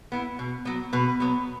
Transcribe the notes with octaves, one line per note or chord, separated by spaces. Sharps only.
B3 E4
B2
F#3 B3
B2 B4
F#3 B3